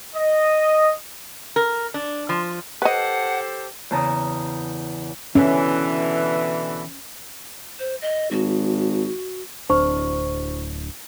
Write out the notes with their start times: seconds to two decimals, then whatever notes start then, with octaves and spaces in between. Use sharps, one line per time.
0.15 D#5
1.56 A#4
1.94 D4
2.29 F3
2.82 G4 A4 B4 C5 D#5 F#5
3.91 E2 C#3 A5 A#5 D#6
5.35 B2 D3 E3 C#4
7.79 C5
8.02 D#5
8.31 G#1 F#4
9.70 D1 D4 C5 C#6